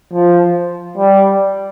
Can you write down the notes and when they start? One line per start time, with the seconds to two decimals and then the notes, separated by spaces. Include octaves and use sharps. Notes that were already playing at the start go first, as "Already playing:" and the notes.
0.13 F3
0.98 G3